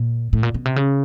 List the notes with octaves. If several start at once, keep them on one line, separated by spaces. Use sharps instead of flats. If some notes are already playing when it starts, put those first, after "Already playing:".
Already playing: A#2
A2
A#2
B2
C3
C#3